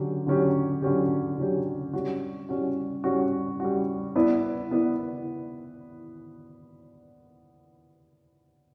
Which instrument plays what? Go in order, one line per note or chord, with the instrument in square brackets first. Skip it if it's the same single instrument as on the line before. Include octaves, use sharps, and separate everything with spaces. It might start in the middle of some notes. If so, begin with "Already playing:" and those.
Already playing: [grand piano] D3 F#3 C#4 G4
D3 F#3 C#4 G4
D3 F#3 C#4 G4
D3 F#3 C#4 G4
G3 C#4 F#4
G3 C#4 F#4
G3 C#4 F#4
G3 C#4 F#4
B3 E4 B4 D5
B3 E4 B4 D5